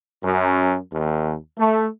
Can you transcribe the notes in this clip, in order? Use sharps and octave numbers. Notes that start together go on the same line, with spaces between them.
F#2
D#2
A3